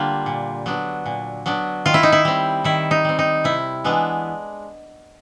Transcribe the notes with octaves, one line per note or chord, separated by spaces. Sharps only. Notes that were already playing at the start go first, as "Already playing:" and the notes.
Already playing: D3 G3 A#3 D4 F4
A#2
F#3 B3 D4
A#2
F#3 B3 D4
D#3 F4
E4
D#4
E4
G3 C4
D#3 E4
D#4
G3 C4
D#4
C3 E4
E3 G#3 B3 D4